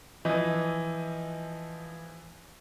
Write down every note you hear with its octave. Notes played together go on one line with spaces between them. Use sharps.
E3 F3 D#5